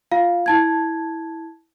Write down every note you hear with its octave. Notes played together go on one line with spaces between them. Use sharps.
F4 F5
E4 A5 G#6